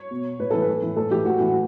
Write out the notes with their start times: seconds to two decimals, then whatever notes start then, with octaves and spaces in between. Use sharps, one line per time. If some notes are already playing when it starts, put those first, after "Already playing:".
Already playing: C#5
0.11 B2
0.39 A2 B4
0.50 E3 A4
0.62 B4
0.68 A2
0.82 E3
0.96 A2 A4
1.10 E3 G4
1.25 A2 F#4
1.39 E3
1.48 F#4